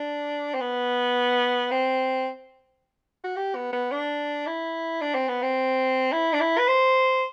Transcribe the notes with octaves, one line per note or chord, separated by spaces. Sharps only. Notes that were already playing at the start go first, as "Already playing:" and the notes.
Already playing: D4
C4
B3
C4
F#4
G4
B3
B3
D4
E4
D4
C4
B3
C4
E4
D4
E4
B4
C5